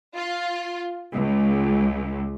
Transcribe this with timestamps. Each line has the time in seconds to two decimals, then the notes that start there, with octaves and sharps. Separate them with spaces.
0.16 F4
1.14 C#2